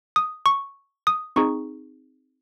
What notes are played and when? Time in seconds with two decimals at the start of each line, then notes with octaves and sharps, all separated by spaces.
0.16 D#6
0.46 C#6
1.07 D#6
1.36 C4 D#4 G#4 C#6